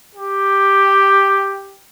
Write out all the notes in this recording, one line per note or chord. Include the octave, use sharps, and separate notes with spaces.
G4